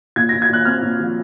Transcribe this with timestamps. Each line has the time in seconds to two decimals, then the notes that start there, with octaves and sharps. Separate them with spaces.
0.16 A#2 G#6
0.29 A#2 A#6
0.42 G#6
0.49 A#2 F#6
0.65 C4 F6
0.82 A#2
0.99 F3